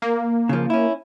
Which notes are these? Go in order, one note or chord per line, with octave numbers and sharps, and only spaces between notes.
A#3
C#3 F3
C#4 E4